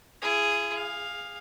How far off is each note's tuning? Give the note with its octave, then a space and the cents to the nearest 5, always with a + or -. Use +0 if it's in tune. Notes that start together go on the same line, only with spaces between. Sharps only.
E4 +45 G#4 +0
G#4 -20 F5 +10